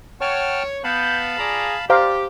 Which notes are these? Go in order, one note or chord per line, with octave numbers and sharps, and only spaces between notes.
C#5 F#5 G5 A5 F6
B3 F5 A5 B5 G6
F4 G#4 D5 A#5
G4 C5 D5 F5 A#5